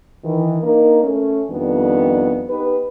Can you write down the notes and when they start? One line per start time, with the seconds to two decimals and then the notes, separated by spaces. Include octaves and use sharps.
0.23 D#3 E3
0.61 A#3 D4 D#4 A#4
1.02 A3 C#4
1.48 F2 D#3 G3 B3 D4
2.48 B3 D#4 G4 B4